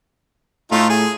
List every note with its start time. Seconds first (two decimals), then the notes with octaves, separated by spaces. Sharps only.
0.72 A2 A3 D#4 F4
0.89 G#4